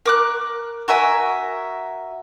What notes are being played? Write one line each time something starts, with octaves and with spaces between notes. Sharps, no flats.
A#4 D6 F#6
F#4 A#4 E5 G#5